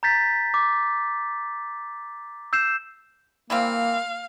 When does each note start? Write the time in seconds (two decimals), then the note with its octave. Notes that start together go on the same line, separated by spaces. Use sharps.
0.03 A#5 G6 A6 B6
0.54 D6
2.53 E6 G6 C7 E7
3.50 E3 G3 A#3 C4 F5